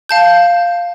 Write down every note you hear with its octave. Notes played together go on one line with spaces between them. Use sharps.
F5 A5 G6